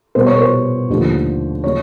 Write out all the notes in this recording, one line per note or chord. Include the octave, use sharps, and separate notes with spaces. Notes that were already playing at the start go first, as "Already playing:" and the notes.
B2 G3 B3 C5
C#5
C5
D#2 D3 F3 A3
C#3 F#3 C#5